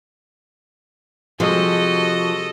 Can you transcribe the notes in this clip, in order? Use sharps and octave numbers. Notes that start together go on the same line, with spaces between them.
C3 F3 G#3 F#4 A4 D#5